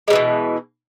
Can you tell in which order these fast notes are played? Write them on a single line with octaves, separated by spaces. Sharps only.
G#3 G3 E3 B2